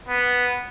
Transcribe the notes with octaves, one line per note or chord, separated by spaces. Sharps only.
B3